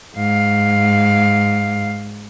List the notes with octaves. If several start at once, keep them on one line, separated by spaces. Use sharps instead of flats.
G#2 F5